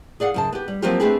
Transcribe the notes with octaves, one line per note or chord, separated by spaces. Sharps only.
G#4 D5 F5 F#5
F#2 C#3 A5
B3 G4
G3
F3 F#3 A#3 C4 F4 G4
A3 C4 D4 G4 G#4 B4